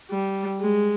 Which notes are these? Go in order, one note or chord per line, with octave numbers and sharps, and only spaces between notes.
G3
G#3